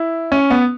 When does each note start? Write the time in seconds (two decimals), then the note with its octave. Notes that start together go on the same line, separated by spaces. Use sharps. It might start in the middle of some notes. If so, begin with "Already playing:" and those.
Already playing: E4
0.32 C#4
0.50 B3